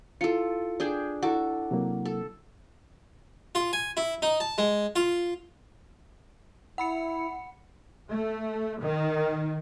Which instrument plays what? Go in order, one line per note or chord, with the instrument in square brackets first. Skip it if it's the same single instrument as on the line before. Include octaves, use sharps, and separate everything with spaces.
[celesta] E4 C#7 [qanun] F4 A4
[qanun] D4 G#4 G5
[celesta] E4 F#5 [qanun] F#4 A4 D6
[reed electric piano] C3 F#3 A#3
[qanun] A4
[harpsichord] F4
G#5
E4
D#4
A5
G#3
F4
[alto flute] E4 [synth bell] F#5 B5 C#7
[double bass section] A3
D#3